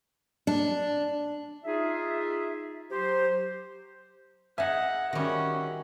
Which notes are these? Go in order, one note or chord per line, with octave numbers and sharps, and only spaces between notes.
D4
D#4 F4 G#4 E5
F#3 G4 C5
D#4 E5 F#5 G#5
D#3 G3 C#4 F#4